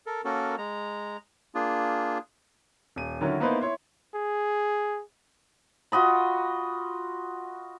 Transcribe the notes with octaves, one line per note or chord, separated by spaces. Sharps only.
A4 A#4
A#3 C#4 F#4 A4 A#4
G#3 A#5
A#3 D4 F4 G#4
D#1 D#7
D3 D#3 F#3 C#4 E4 A#4
A#3 B3 D#4 E4 B4 C5
E4 C#5 C6
G#4
F4 F#4 D#5 B5